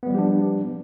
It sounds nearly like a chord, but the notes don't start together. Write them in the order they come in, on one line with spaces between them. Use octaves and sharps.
B3 G3 F3 G4 D4